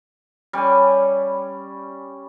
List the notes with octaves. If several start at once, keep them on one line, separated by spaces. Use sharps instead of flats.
G3 C#4 D5 G#5